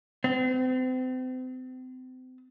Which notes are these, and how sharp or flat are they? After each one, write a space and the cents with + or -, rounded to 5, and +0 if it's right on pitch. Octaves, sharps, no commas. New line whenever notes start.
C4 -35